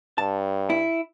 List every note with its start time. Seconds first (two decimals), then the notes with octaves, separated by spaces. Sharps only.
0.18 G2 A5
0.70 E4